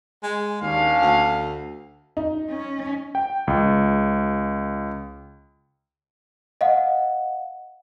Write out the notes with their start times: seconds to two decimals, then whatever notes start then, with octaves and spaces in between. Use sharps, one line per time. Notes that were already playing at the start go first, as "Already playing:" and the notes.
0.23 G#3
0.62 D#2 C#4 D4 F5
1.02 D2
2.17 D#4
2.50 C#4
3.15 G5
3.47 C#2
6.61 D#5 F5 F#5